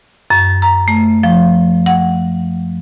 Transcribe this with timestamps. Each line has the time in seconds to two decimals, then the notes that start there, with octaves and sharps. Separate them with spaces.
0.30 F#2
0.62 A#5
0.88 A3
1.23 F3
1.86 F#5